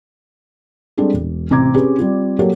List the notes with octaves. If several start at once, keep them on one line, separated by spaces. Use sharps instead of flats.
G3 G#3 C4 D4 G#4 A4
E1
A1 C3 C4 A#5 D6 G#6
C4 C#4 G4 G#4 B4
G3 C4 F4
F#3 A#3 F#4 G4 A4 C#5